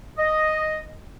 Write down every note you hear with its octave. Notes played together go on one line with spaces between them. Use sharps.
D#5